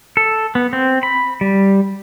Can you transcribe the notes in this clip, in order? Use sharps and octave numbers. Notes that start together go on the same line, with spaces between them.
A4
B3
C4
B5
G3